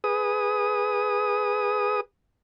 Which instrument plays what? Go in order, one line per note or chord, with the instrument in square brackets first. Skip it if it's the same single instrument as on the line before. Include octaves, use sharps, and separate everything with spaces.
[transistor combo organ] G#4 B4 D#6